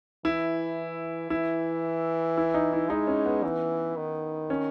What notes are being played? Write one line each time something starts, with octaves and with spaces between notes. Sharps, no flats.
E3 E4
E3 E4
E4
D#4
E4
G#3 D#4
C#4
B3
E3
D#3
C#4